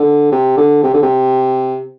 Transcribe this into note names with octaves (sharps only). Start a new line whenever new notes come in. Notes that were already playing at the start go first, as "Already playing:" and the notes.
Already playing: D3
C3
D3
C3
D3
C3